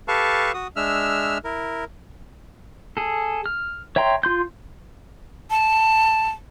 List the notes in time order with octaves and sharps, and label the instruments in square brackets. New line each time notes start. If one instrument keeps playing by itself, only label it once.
[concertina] G4 A4 B4 F5 A5 C#6
F#4 D#6
G#3 D4 E5 E6 F6
E4 A#4
[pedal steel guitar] G#4 A4
F6
C#5 E5 G5 A#5 C6
F4 C6 G6
[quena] A5